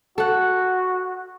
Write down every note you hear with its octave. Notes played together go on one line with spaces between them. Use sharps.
F#4 A4 F#5